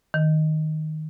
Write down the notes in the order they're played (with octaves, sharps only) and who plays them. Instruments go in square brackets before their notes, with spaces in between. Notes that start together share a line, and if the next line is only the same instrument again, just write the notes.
[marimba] D#3